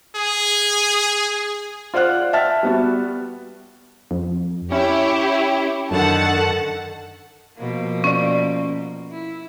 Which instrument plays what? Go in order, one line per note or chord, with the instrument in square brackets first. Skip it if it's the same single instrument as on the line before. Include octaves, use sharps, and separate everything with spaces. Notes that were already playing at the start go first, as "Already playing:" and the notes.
[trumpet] G#4
[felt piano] F4 C5 D5 F#5 F6 F#6
E5 G5 A5 F6 A6
G3 B3 F#4
[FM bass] F2
[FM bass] C#4 [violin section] E4 G4 C#5
[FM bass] F#2 [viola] D3 D#3 [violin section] F#5 A5
[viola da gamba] B2 F3 A#3
[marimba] C#4 D5
[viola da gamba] E4